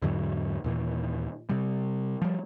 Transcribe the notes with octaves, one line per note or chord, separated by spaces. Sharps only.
E2 G#2 D3 F#3
D#2 A#2 E3
C3 G3
F3 G3